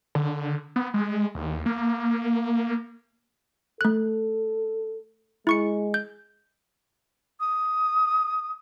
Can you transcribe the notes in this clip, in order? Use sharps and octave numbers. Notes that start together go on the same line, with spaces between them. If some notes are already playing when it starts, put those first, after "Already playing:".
D3
B3
G#3
D#2
A#3
A3 A4 F#6
G#3 E4 C#6 C#7
G6
D#6